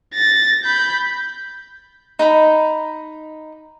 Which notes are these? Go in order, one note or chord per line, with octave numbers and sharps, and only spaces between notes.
A6 A#6
B5 G6
D#4 A#5 B5